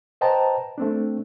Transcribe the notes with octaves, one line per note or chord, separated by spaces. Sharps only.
B4 C5 D#5 G5 A5 A#5
A3 C4 D4